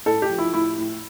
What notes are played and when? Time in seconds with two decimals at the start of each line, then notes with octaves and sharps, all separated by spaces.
0.06 A2 A4
0.22 G4
0.29 F3
0.38 E4
0.54 A2 E4
0.78 A2